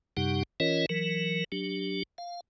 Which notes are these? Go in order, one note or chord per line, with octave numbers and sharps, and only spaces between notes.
F#2 C3 G3 D#4 G4 F#5
E3 C#4 F4 A#4 C#5 D#5
E3 F#3 A#4
F#3 D4 G4
F5